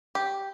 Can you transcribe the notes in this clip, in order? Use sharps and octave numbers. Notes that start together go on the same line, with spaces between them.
G4